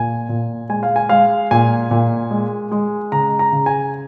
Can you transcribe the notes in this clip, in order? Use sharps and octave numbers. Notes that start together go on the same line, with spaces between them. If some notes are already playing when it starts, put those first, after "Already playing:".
Already playing: A#2 G#5
A#2
G#3 G#5
F5
G#5
G#3 F5
A#2 G#5
A#2
G#3
G#3
C#3 A#5
A#5
C#3
G#5